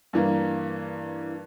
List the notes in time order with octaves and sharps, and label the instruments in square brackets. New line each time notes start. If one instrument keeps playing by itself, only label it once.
[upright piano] G2 E3 A#3